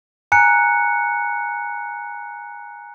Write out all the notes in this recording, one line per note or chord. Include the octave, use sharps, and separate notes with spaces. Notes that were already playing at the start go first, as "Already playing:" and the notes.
G#5 A#5 F#6 C#7